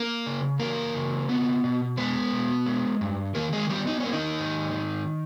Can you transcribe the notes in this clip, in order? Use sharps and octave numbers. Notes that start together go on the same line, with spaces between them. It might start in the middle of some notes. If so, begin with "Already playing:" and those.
Already playing: A#3 A#4
C#3
E3 A#3 A#4
C#3
B3
B2
G#3 B3 B4
B2
G#3
G2
D#3 A#3 A#4
G#3 G#4
G3 B3 G4
D#4
A#3 C#4
D#3 D#4
G#2
D#3